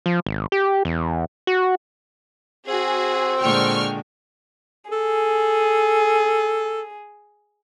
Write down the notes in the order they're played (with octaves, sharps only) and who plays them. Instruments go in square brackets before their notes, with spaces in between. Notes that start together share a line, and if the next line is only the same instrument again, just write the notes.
[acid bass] F3
G#1
G4
E2
F#4
[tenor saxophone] C4 [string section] F#4 G#4
[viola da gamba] A#2 D3 G#3 [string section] G5 C#6 F6
[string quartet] G#4 [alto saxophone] A4